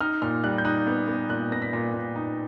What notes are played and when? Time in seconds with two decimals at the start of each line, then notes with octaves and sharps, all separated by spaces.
0.01 D#4 F6
0.22 A#2 F6
0.44 G3 F#6
0.58 G6
0.65 D#4 F#6
0.87 B3
1.08 B3
1.29 A#2 F#6
1.51 B3 A#6
1.62 B6
1.73 A#2
1.94 A#2
2.16 D#4